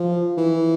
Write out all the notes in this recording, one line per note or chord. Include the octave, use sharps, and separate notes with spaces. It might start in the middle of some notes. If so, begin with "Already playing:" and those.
Already playing: F3
E3